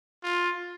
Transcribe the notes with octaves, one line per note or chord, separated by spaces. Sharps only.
F4